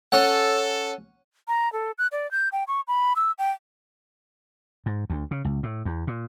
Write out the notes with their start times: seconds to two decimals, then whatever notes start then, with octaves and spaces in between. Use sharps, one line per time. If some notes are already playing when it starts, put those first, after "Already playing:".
0.12 C#4 A4 F#5
1.48 A#5
1.73 A4
1.98 F#6
2.12 D5
2.31 G6
2.52 G5
2.68 C#6
2.88 B5
3.16 E6
3.38 G5
4.86 G#2
5.10 D2
5.31 C#3
5.45 C#2
5.63 A2
5.85 E2
6.07 A#2